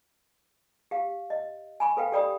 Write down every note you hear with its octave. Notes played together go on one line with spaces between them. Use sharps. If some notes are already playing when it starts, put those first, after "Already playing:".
G4 F5
D#5
G#5 B5 C#6
A4 B4 F5 G5
G4 A4 D5 G5 B5 D#6